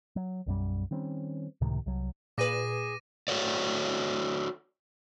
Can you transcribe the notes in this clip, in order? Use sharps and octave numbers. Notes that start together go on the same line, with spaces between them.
F#3
B1 F#2 G3
D#3 G3 C4 C#4
C#2 A2 C3 D#3
C2 F#3
A#2 G#4 B4 D6 A#6 D#7
F#4 A4 C#5 D5